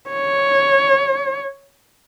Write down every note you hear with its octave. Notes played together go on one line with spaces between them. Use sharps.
C#5